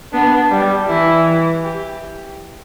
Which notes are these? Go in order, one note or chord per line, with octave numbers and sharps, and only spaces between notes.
B3 D4
G3
E3 E4
G4